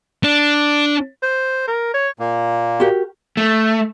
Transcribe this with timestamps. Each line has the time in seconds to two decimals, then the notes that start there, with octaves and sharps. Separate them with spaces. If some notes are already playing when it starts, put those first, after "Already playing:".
0.24 D4
1.23 C5
1.68 A#4
1.94 C#5
2.19 A#2 A#3
2.80 F#4 G4 A#4
3.37 A3